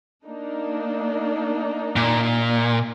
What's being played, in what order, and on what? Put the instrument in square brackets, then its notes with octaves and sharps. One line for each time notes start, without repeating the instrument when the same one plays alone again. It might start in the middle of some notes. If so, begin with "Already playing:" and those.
[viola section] A#3 D4 D#4
[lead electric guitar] A#2